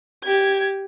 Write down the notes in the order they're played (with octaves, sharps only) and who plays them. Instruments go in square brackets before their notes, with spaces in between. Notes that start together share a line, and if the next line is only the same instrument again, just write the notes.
[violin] G4 G#6